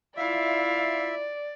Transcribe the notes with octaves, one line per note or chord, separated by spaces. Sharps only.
E4 F4 D5 E5 F5